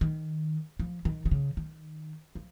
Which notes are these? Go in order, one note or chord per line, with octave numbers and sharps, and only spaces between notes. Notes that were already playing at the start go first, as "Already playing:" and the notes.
D#3
F3
D#3
D#3
C#3
D#3
F3